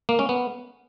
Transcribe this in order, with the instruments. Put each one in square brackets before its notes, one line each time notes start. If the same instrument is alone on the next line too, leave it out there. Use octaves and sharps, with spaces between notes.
[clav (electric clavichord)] A#3
C#4
B3